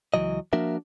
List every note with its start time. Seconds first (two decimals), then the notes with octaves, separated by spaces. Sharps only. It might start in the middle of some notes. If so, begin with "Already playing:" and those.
0.14 C#2 E3 F#3 D#5
0.53 F3 A#3 D4 F#4 A#4 E5